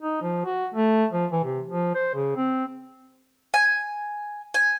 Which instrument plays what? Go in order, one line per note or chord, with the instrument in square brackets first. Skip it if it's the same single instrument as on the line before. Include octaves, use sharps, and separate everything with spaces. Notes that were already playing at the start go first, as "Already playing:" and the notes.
[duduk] D#4
F3
F#4
A3
F3
E3
C3
F3
C5
C#3
C4
[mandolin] G#5
G#5